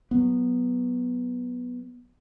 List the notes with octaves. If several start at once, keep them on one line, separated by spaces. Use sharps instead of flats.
F#3 B3